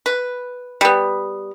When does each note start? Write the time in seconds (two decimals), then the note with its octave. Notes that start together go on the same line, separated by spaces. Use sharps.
0.06 B4
0.81 G3 B3